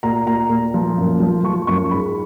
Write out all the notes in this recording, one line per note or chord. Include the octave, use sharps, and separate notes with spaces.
A#2 A#5
A#2 A#5
A#2
F3
F#2
F3
F3 C#6
F#2 C#6
G#2 B5